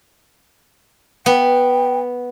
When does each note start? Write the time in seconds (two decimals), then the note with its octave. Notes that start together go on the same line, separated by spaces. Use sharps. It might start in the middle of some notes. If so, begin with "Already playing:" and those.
1.26 B3 G5